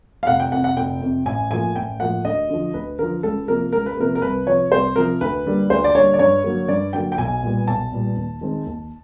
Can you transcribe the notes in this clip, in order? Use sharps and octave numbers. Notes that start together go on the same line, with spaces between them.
F5
F1 F#5
G5
F2 C3 F#5
F#5
F1 G5
F2 C3
A1 G#5
A2 F3 A#3 G#5
A1 G5
A2 F3 A#3 F#5
D2 D#5
D3 F3
D2 B4
D3 F3 A#4
C#2 A4
C3 F3 A#3 A#4
C#2 A#4
B4
C3 F3 A#3 A#4
A#4
C2 B4
C3 F3 C#5
C2 C5
C3 F3 A#4
D2 B4
D3 G3 A#3
D2 C5
D5
D3 G3 A#3 C#5
D5
G2 C#5
D3 F#3 A#3
G2 D5
D3 F#3 A#3 G5
G5
B1 G#5
A#2 G3 B3
B1 A5
A#2 G3 B3
D#2
D#3 G#3 C4
D#2